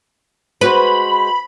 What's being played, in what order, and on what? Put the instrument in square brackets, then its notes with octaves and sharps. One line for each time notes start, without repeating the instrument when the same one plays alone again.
[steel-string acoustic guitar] G#3 F#4 C5 [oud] B4 [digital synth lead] B5